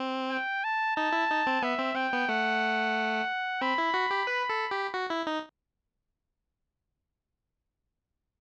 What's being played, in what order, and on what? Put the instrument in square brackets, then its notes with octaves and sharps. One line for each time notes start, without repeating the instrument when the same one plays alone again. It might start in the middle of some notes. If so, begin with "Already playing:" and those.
Already playing: [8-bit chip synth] C4
[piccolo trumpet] G5
A5
[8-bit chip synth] D#4 [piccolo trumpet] A5
[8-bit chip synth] E4
D#4
C4
[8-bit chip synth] B3 [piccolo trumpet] E5
[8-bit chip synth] C4
[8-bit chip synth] C4 [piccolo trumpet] G5
[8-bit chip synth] B3
[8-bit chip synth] A3 [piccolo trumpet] F#5
[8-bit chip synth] C4 [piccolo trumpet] B5
[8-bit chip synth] E4
F#4
G4
B4
A4
G4
F#4
E4
D#4